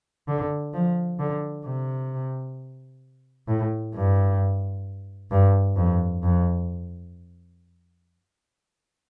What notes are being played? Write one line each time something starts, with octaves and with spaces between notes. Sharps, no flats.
D3
F3
D3
C3
A2
G2
G2
F2
F2